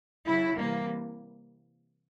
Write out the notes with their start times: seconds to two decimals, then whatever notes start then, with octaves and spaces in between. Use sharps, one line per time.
0.27 C#3 F#3 E4
0.59 C3 E3 G3 A#3